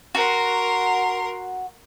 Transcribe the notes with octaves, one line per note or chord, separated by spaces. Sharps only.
F#4 A#4 C6